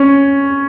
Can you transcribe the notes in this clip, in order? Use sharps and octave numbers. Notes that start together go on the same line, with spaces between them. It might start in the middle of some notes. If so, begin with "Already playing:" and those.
Already playing: C#4